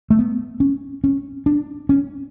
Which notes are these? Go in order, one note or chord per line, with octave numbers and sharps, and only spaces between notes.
A3
B3
C#4
C#4
D4
C#4